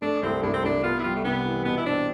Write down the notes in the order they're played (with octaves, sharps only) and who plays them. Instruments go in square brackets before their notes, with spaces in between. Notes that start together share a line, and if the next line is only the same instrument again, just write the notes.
[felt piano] A3 [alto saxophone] D4
[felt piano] C2 [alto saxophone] C4
[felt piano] C2 [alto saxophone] D4
[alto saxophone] C4
[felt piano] C2 [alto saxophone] D4
[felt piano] B3 [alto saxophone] F4
[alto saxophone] E4
[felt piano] G3 [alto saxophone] F4
[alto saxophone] A3
[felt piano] C3 [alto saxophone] B3
[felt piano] E3
[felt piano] B2 [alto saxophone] B3
[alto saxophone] E4
[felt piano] C4 [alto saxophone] D4